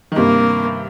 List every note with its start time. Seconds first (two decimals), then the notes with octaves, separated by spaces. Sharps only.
0.12 D#3
0.16 G2 C3 A#3